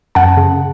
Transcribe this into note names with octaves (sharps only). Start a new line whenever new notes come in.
F#2 F#5 A5
C#3